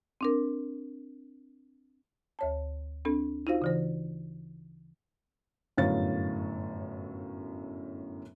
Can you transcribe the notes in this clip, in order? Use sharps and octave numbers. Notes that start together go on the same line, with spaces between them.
C4 D4 A#4
D2 C#5 A5
C4 D4 A4
D#4 F4 F#4 C5 F5
C#3 E3 C5
G1 F#2 A2 C#5 F5 A6